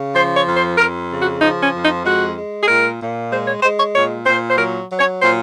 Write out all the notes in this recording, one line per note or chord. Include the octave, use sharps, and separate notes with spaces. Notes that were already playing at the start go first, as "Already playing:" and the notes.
Already playing: C#3
F3 C5
C#5
F2
C5
F2 A#4
C#3
F#4
F3 D#4
C#4
F2
D#4
G#3 F#4
G#3
G#4
A#2 A#4
A#2
G#3 C5
C#5
G#3 C5
C#5
A#2 C#5
A#2 C5
C5
F#3 A#4
F#3
C#5
A#2 C5